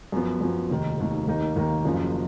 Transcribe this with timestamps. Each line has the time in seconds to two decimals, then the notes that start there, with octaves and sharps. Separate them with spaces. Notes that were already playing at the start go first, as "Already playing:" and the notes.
0.12 F#2 F3 B3
0.41 F#2 F3 B3
0.70 F1 D#2 D#3
0.98 F1 D#2 D#3
1.27 D#2 D#3 A#3 D#4
1.56 D#2 D#3 A#3 D#4
1.85 F#1 F#2 C#3 F3